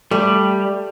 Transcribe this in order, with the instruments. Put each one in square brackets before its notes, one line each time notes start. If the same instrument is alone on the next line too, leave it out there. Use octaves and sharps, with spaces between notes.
[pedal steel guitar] G3 [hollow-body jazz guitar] A3